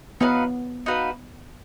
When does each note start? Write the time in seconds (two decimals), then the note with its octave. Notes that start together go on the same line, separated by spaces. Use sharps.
0.20 B3 D#4 F#4 B4 F5
0.86 D#4 F#4 B4 F5